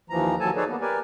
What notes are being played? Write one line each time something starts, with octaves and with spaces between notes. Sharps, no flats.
D#2 E3 F3 A#5
D#2 F#3 A4 G#5 A5
D#4 G#4 A4 B4 C#5 D5
A#3 B3
G4 A#4 B4 D5 G#5